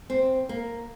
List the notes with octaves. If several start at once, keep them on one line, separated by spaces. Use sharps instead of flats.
C4
A#3